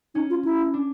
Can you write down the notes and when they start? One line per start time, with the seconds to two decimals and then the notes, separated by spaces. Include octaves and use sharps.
0.15 C#4 D#4
0.30 F4
0.45 E4
0.74 D4